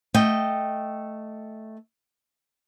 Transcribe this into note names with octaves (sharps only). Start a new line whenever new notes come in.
A3 D#5 G5